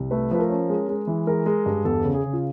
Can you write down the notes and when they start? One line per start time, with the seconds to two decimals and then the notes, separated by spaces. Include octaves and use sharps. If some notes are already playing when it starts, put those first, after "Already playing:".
Already playing: C2
0.11 A3 B4
0.31 F3 B4
0.40 A#4
0.50 C#4
0.69 G#3
0.89 G#3
1.07 E3
1.27 G#3 A#4
1.46 G#3
1.66 G2
1.85 E2 A4
2.04 C#3
2.14 G#4
2.24 C#3
2.33 F4